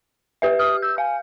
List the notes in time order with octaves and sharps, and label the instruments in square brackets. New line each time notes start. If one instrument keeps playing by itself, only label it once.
[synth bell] G4 B4 E5
[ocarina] D#6 [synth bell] F6
[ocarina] E6 [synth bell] G6
[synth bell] F5 [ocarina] G#5